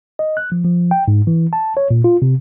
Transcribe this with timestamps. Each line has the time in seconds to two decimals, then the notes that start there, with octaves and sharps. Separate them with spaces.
0.19 D#5
0.37 F#6
0.52 F3
0.64 F3
0.91 G5
1.08 G#2
1.27 E3
1.53 A5
1.77 C#5
1.91 A#2
2.04 F4
2.22 C3